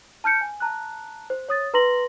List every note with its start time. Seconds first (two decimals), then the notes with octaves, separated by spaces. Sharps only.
0.24 A5 F6 G6 C#7 D7
0.41 G#5
0.60 A5 A#5 F#6
1.30 C5
1.49 C#5 D#6 A6
1.74 B4 A#5 C6 A#6 F#7